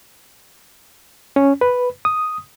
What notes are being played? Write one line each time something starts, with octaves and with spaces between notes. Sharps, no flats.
C#4
B4
D#6